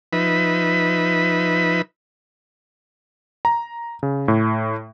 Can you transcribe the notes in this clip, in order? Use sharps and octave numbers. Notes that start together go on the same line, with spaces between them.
F3 D#4 B4 E5 B5
A#5
C#3
A2